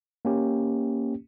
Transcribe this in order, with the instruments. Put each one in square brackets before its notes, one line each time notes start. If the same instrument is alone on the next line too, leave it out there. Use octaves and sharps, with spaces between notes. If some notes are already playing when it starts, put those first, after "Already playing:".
[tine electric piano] A#3 C#4 G4